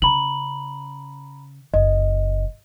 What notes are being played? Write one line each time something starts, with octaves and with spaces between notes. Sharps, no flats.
C#3 A#5 B5 F#7
F#1 D#5